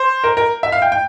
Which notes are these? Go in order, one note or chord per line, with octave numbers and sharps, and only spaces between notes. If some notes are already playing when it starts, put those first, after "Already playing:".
Already playing: C5
A#4
A#4
E5
F5
G5
G5